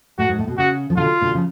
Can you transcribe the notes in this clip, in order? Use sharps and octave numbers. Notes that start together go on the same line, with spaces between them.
A2 F#4
G#2
A2
B2
C#3 F#4
F3
B2 D3 F4
B2 D3
C#3 F3